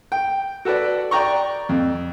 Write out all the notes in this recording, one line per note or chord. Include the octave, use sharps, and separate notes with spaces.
G5
F#4 A4 B4 D5
D5 G5 A#5 C#6
F2